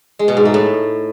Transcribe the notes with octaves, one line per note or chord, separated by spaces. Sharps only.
G#3
B2
G#2
A3
A2